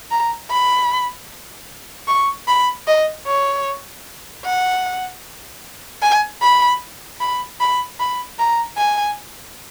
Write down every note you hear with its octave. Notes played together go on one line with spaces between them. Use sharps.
A#5
B5
C#6
B5
D#5
C#5
F#5
G#5
B5
B5
B5
B5
A#5
G#5